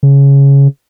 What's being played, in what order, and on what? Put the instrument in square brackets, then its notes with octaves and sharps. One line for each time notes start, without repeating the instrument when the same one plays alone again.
[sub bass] C#3